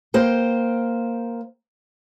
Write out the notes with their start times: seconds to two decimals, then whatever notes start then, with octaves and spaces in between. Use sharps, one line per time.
0.14 A#3 C5 G5